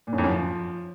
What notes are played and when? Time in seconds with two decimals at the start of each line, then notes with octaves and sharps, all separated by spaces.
0.07 A#2
0.13 F#2
0.18 F2
0.24 F#2
0.29 F3